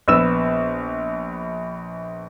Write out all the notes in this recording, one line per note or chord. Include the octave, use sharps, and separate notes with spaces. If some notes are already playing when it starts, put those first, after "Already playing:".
A#1 B3 E6 E7